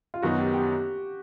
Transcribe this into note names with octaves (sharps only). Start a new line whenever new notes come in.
F4
F#2 D#3 F#3 B3 D#4 F#4
G4
G4